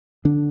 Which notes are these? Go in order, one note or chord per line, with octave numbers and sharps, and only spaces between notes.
D3 D4